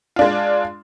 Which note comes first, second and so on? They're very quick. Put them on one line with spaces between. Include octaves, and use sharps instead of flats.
F4 D4 G#3